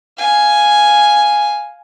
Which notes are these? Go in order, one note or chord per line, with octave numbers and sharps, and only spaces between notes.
F5 G#5